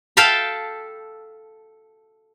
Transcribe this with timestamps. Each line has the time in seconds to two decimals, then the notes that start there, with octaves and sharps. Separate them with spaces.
0.17 A4 F5 G5 A5 B5